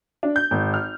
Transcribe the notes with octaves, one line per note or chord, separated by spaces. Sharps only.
D4
G6
G#1
F6